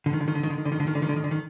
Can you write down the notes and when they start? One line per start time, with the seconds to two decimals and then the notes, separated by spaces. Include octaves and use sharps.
0.06 D3
0.13 D#3
0.20 D3
0.28 D#3
0.35 D3
0.43 D#3
0.50 D3
0.58 D#3
0.65 D3
0.72 D#3
0.80 D3
0.87 D#3
0.95 D3
1.02 D#3
1.09 D3
1.16 D#3
1.24 D3
1.31 D#3